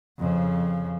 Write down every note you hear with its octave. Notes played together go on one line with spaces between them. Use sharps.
F2 C#3